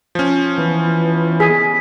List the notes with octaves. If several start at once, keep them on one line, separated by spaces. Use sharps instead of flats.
F3 C#4
E3 B3
G#4 B6